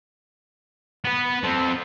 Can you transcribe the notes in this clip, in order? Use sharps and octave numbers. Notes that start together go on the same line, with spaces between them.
B3 B4
C4 A4